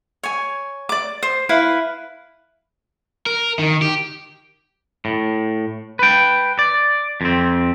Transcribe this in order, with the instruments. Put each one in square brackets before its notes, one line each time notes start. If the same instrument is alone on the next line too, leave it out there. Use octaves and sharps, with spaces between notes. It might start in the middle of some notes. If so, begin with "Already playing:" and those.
[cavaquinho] C#5 G#5
D5 D6
C5
E4 B4 F5
[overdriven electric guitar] A#4
D#3
G4
[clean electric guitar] A2
B4 G5
D5
F2 C4